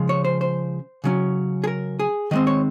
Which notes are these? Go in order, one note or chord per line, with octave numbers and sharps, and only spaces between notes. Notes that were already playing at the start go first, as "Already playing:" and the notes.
Already playing: C#3 F3 G#3
C#5
C5
C5
C#3 F#3 C#4
G#4
A#4
G#4
D#3 G#3 C4 D#5
C#5